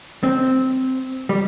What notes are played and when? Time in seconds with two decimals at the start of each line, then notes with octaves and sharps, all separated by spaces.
0.23 C4
1.29 G3